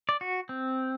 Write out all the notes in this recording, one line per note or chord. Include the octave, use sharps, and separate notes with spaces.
D5
F#4
C4